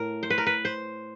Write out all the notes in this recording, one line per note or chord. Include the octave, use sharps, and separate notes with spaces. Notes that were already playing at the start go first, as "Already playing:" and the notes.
Already playing: A2 A#4
C5
B4
A#4
B4
C5